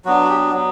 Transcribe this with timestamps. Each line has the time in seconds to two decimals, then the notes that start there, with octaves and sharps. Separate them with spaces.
0.05 F#3 B3 D4 F#4
0.24 F#4
0.29 G4
0.53 F#3 B3